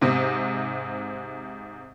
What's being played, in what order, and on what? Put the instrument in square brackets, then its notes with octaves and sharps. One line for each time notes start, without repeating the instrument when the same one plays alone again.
[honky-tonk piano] G#2 C3